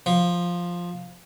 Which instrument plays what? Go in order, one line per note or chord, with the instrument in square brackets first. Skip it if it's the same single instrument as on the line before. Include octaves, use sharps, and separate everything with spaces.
[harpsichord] F3